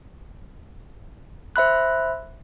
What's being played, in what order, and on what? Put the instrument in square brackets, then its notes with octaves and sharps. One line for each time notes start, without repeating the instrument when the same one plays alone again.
[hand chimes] C5 E5 B5 F#6